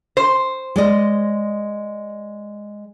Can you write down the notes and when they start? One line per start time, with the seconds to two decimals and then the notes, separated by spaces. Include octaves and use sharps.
0.17 C5
0.76 G#3 D5 D#5